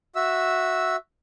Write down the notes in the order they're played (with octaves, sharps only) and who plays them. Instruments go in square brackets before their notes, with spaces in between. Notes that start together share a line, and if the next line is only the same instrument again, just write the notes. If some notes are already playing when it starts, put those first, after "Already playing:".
[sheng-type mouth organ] F#4 E5 E6